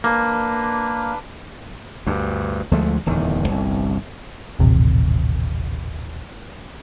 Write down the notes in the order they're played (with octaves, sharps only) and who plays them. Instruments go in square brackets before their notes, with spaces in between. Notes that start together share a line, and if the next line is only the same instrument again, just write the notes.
[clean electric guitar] A#3 [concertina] D4 B4
[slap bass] D2 G2
D2 F3 G#3 A3
D1 E2 D#3
G1 C2
[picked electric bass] D#1 A1 C3